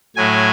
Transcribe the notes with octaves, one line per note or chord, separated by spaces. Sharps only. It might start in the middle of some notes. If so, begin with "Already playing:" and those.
A2 F#3 A3 G#5